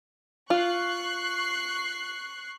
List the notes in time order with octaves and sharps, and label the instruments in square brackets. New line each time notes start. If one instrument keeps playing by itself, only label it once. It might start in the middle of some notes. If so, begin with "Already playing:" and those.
[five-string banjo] F4 [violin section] C#6 F#6 C7